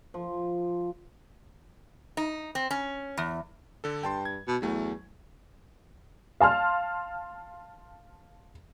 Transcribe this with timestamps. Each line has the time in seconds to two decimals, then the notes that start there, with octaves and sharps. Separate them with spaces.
0.14 F3
2.17 D#4
2.55 C4
2.71 C#4
3.17 E2
3.84 D3 A4
4.03 G2 G5 A5 C6
4.25 G#6
4.48 B2
4.62 E2 F#3 A3
6.40 F5 A5 C6 F6